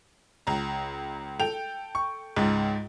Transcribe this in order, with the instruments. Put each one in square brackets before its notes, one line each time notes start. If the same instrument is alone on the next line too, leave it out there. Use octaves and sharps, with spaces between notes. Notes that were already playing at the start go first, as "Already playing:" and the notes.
[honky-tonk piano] C#2 A#5
A4 G5 F7
[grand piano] C#6
[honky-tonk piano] C#2 [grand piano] G#2